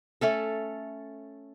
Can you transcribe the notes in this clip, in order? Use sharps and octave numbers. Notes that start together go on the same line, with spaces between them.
A3 C#4 A4